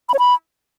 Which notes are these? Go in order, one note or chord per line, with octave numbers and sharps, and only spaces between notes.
B5
C#5
B5